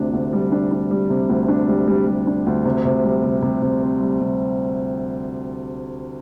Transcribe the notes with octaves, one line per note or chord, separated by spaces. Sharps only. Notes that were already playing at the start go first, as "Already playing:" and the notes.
Already playing: D2 C3 D4
D2
G3
D4
D4
G3
C3
D2
D4
G3
G3
G3
D4
D2
C3
C3
G3
C3
C3
C3
C4
G3
C3